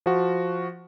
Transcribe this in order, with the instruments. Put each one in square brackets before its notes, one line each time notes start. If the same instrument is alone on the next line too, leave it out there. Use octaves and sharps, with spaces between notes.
[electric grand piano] F3 F#4